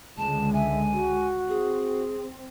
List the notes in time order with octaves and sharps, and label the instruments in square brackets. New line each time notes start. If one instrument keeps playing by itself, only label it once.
[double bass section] C#2 D3 G#3 [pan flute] A5
[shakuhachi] E5 [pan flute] G#5
[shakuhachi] F#4
[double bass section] C4 [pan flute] G#4